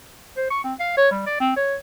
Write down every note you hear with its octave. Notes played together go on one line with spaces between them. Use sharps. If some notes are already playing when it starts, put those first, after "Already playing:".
C5
C#6
C4
F5
C#5
G3
D5
C4
C#5